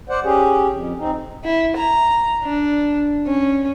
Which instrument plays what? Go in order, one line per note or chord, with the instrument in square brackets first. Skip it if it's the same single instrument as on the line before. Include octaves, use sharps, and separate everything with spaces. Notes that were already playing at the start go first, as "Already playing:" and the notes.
[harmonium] C5 D5 F#5
C#4 G4 G#4
F2
C4 D#4
[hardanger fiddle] E4
A#5
D4
C#4